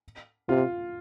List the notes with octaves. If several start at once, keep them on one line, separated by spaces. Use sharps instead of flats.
C3 F4